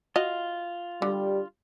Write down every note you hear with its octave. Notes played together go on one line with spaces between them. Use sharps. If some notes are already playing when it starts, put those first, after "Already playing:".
F4 F#4 D#5
D3 G3